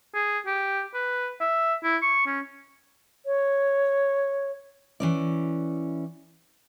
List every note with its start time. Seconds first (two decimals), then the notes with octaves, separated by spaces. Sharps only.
0.15 G#4
0.46 G4
0.94 B4
1.41 E5
1.84 E4
2.02 C#6
2.26 C#4
3.24 C#5
5.00 E3 C#4 D5